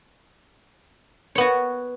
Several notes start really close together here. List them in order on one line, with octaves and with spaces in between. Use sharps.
C#5 B3 F#4